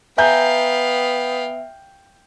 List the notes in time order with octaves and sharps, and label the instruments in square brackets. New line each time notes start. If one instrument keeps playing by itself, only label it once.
[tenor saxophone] B3 [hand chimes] E5 [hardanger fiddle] F5 G5 [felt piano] G#5 A#5 G6